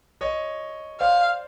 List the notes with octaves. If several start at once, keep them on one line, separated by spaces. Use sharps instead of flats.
C#5 D#5
C5 D5 F5